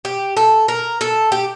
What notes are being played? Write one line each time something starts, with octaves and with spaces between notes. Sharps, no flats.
G4
A4
A#4
A4
G4